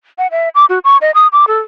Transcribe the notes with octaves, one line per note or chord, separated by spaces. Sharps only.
F#5
E5
D6
F#4
C#6
D#5
D#6
D6
A4